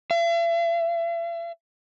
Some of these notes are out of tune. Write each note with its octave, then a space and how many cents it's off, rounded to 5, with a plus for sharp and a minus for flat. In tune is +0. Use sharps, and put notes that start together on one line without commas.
E5 +45